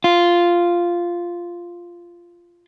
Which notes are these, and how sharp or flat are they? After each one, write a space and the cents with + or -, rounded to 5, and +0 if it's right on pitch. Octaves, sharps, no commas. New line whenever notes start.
F4 -5